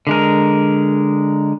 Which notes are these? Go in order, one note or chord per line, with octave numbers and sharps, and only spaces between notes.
D3 G#3 A#4